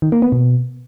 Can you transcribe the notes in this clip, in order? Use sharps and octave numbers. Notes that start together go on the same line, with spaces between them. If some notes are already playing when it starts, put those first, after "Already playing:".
D#3
A#3
B3
B2